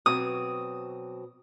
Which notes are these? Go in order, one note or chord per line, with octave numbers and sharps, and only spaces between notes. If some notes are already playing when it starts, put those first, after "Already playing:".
B2 F#3 C4 D#6